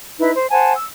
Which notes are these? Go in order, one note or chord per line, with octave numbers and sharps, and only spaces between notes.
D#4 E4 B4
C5
C5 F#5 G#5 A5
E6